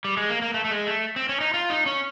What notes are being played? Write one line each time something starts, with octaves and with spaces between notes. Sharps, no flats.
G3
G#3
A#3
A#3
A3
A3
G#3
A3
C4
C#4
D#4
F4
D#4
C#4